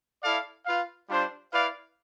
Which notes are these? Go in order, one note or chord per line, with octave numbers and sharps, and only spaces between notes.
E4 A4 D5 F5
F4 B4 F5
G3 D4 F4 C5
E4 B4 D5 F5